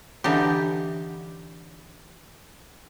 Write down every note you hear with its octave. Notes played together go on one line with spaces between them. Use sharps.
D3 E3 D4 D#4 G4